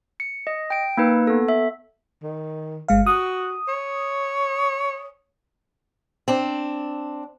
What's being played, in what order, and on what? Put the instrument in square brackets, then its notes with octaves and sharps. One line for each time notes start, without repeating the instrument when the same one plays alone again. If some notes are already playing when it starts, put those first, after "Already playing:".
[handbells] C#7
D#5
G5 D7
A#3 D#4 B4
B3 A4
E5
[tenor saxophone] D#3
[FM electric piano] G1 G#3 F5
[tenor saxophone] F#4 [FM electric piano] D#6
[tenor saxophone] C#5
[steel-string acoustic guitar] C4 D4